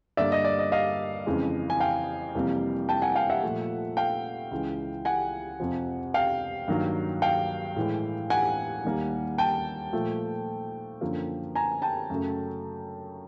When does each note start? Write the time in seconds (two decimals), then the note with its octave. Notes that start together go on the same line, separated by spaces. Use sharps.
0.17 G2 D3 G3 A#3 D5 E5
0.32 D#5
0.45 D5
0.59 D#5
0.72 D#5 F5
1.26 F2 C#3 E3 G#3
1.70 G#5
1.80 F5 G5
2.35 F2 C3 E3 G3 A#3
2.89 G5 A5
3.02 F#5 G#5
3.15 F5 G5
3.30 E5 F#5
3.43 A#2 F3 A3
3.97 F5 G5
4.51 C#2 C#3 E3 G#3
5.05 F#5 G#5
5.60 F2 C3 F3
6.14 F5 G5
6.68 G2 D#3 F#3 A#3
7.22 F5 G5
7.76 A2 E3 G#3
8.30 F#5 G#5
8.85 D#2 D#3 G3 A#3
9.38 G5 A5
9.93 A#2 F3 A3
11.01 F#2 D3 F3 A#3
11.55 G#5 A#5
11.82 G5 A5
12.10 F#2 C#3 F#3 A3